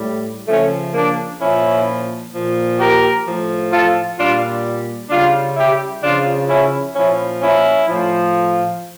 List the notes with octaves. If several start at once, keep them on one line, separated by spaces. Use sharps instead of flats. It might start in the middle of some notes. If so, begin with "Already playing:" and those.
Already playing: A2 G3
C#3 F3 A3 C#4
A#3 D4
A#2 F3 C#4 E4
A#2 F3
G4 A#4
A2 F3
F4 A4
A#2 G3 D4 F4
C#3 G3 D4 F4
E4 G4
C#3 F3 D4 F4
C#4 E4
A#2 F3 C#4 E4
C#4 E4
A2 F3